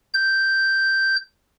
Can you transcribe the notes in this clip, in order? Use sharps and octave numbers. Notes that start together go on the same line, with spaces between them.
G6